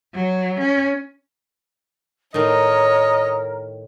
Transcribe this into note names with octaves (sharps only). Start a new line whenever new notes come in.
F#3
C#4
A2 D#3 A#4 C#5 D#5